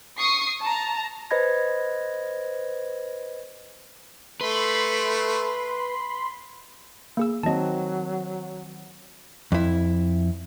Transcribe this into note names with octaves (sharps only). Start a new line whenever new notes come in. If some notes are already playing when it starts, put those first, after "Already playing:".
C#6 D#6 C7
A5 A#5
B4 C5 D#5 B5 G#6 A#6
A3 B4 B5 C6
A#3 G#4 E6
D#3 F#3 C4 D#5 A5
F2 E4